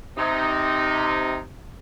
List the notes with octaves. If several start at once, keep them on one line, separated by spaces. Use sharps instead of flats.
C3 D#4